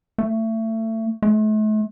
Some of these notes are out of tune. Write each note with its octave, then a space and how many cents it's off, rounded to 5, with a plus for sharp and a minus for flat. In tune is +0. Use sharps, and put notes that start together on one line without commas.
A3 +25
A3 -40